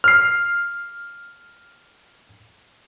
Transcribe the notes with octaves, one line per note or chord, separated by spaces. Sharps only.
F6 C7